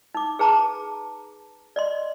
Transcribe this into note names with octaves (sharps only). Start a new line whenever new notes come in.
D#4 D6
G#4 B4 A5 A#5 D6
D5 D#5 C6